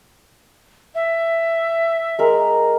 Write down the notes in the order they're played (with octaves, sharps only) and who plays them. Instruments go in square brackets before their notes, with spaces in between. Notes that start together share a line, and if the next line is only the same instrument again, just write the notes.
[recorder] E5
[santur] G#3 A#4